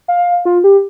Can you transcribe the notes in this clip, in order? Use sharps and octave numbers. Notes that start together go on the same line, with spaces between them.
F5
F4
G4